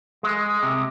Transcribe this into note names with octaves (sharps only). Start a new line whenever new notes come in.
G#3
C3